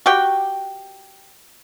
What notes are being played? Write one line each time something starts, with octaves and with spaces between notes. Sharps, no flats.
F#4 G4 G5